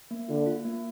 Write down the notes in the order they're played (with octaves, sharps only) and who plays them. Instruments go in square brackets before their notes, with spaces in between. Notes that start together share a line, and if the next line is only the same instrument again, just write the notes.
[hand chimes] A#3
[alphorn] D3 [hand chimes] F4
[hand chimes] F4
A#3